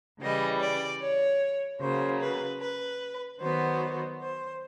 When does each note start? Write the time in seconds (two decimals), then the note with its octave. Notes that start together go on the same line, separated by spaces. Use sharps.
0.20 C#3 E3 G3 D#5
0.60 D5
1.01 C#5
1.80 C#3 F#3 A#3 C5
2.20 B4
2.61 B4
3.41 D#3 F#3 B3 C5
4.21 C5